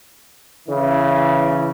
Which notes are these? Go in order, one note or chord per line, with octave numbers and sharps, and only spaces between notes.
C#3 E3